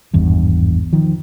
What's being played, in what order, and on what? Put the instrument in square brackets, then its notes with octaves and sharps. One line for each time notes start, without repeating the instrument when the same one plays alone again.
[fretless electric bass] G#1 E2 G2
D#3 F3